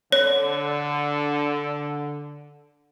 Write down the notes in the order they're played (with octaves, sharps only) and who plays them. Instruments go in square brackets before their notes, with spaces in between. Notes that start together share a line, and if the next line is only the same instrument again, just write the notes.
[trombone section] D3 [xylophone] C#5